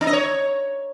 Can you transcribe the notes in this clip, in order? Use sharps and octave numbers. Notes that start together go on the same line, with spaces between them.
D4
D#5
C#5